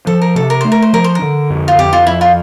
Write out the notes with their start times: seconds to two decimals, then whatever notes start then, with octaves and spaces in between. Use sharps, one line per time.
0.07 F3 A4
0.22 A#4
0.35 C3 A4
0.50 A#4
0.61 A3 C5
0.72 A#4
0.82 C5
0.93 F3 A#4
1.04 C5
1.15 A#4
1.22 D3
1.50 F2
1.68 F4
1.78 F2 G4
1.93 F4
2.07 F3 E4
2.21 F4